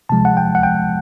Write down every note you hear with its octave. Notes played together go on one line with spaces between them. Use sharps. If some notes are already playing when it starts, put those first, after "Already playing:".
C3 F3 G#3 A5
F#5
G5
F#5
G5